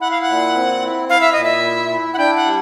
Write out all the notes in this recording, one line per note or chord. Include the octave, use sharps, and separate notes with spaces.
E4 F#5
F5
F#5
A#2
C4
E4
E4 F5
E5
A#2 D#5
E5
E4
E4
F#5
D4 G5
F#5
G3